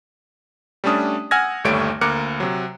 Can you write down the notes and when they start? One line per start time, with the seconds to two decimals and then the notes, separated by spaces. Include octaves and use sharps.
0.84 G3 A3 C#4 D4 D#6
1.31 F#5 G#5 E6 F6 G#6 A#6
1.64 G1 D#2 G3 A3 C#5 D7
2.01 D2 A#3 A#4 D6 F#6 C#7
2.40 C3 F#3